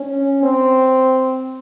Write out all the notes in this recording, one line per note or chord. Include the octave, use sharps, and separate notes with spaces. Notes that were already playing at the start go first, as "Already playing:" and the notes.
Already playing: C#4
C4